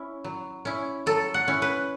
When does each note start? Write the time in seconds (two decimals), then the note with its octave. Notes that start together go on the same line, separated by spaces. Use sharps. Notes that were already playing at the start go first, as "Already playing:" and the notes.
Already playing: C#4 E4
0.24 F#3
0.65 C#4 E4
1.06 F#3 A4
1.34 F#5
1.48 C#4 E4
1.62 B4